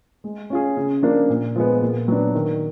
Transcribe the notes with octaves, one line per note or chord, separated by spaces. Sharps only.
G#3
C#4 F4 G#4
C#3
F3 A#3 D4
A#2
F3 G#3 B3
A#2
F#3 B3 D4
D#3